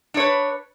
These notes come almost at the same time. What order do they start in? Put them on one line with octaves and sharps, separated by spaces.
D4 C#5 B4